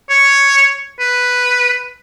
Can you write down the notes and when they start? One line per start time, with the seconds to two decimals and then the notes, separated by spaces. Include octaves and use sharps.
0.10 C#5
1.00 B4